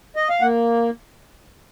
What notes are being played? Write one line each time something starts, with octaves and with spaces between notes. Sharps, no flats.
D#5
F5
A#3 F#5